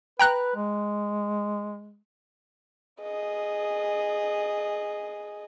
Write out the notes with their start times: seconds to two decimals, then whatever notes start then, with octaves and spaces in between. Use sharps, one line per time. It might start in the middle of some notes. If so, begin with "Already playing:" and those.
0.19 B4 G5 A#5 F#6
0.56 G#3
3.01 G#4 D#5